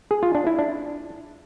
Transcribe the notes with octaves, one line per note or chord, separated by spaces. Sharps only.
G#4
F4
D4
E4
D4